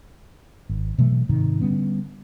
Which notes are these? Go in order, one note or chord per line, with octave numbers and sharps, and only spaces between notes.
G#1
B2 E3 F#3 A3
G#2 C3 D#3
D3 G3 B3 C#4